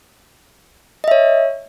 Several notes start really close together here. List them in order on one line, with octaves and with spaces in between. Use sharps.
D#5 E5 C#5